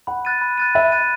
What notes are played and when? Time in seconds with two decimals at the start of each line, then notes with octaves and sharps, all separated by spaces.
0.07 F#5 B5
0.25 F#6 A6 D#7
0.41 B5
0.57 F#6 A6 D#7
0.75 E5 B5
0.92 F#6 A6 D#7